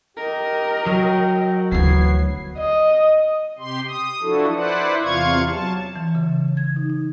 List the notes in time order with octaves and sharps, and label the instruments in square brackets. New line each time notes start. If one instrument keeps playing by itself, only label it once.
[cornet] G4 [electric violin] A#4 D#5
[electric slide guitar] F#3 [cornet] G5
[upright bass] D2 E3 [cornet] B3 [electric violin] G#6 C7
[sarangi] D#5
[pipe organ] C3 G4 C6
D#6
F3 D4 E4 F#4 A4
E4 B4 C5 D5 F#5
E2 C3 F4 F5 C#6 G#6
F#3 A5
[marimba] E3
C#3
G#6
D#4
D#4